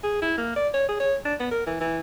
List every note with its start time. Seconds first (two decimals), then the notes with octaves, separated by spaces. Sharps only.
0.03 G#4
0.22 E4
0.37 A#3
0.56 D5
0.74 C#5
0.88 G#4
1.00 C#5
1.25 D4
1.40 B3
1.51 A#4
1.66 E3
1.80 E3